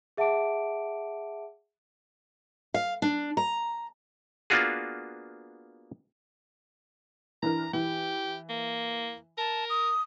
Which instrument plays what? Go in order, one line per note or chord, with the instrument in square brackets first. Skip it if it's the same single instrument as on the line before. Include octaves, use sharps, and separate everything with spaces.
[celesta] G#4 E5 F#5 A5 D6 D7
[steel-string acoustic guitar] F5
D4
A#5
[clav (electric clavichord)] A#3 B3 D4 F4 F#4 G#4
[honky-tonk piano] E3 D4 A#4 [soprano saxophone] A#5
[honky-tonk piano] E3 [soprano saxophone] G4
[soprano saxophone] A#3
[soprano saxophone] A#4 [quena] A5
[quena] D#6